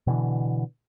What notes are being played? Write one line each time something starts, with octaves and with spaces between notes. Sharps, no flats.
B2 D3 E3